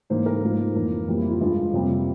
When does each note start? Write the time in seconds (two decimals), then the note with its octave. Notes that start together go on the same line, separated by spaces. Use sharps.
0.10 G#2 E3 A#3 C5
0.26 A#4
0.42 G#2 F3 A#3
0.75 F2 E3 A#3
1.08 F2 E3 G3 A#3
1.19 E4
1.30 F4
1.40 G2 F3 G#3 F4
1.73 F2 C3 G3 A#3